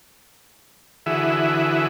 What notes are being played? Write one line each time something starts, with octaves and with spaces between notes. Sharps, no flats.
D3 E3 E4 F#4 G#4 E5